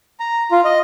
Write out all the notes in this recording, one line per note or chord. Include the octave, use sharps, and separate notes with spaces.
A#5
F4
D#5